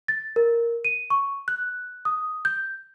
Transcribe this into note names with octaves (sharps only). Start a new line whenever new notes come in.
A6
A#4
D#7
C#6
F#6
D#6
G6